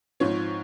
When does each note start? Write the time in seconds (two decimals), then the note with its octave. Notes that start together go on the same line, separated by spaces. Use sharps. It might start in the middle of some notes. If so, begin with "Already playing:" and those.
0.20 G#2 F3 C4 C#5